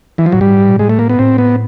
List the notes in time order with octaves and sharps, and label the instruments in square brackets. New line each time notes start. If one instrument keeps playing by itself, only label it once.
[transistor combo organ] E3
F3
[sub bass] A2 [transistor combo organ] F#3
[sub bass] G#2 [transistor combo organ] G3
[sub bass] A#2
[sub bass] A2 [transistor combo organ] G#3
[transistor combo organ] A3
A#3
B3
[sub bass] A2 [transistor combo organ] C4
[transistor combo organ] B3